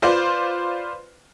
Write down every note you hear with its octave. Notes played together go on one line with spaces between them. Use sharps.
F4 B4 C5 D5 F5